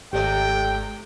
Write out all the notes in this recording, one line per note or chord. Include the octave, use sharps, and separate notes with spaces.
G#1 C3 G#3 G4 D5 G5